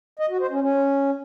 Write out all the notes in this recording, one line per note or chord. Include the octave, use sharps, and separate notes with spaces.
D#5
F#4
C5
C#4
C#4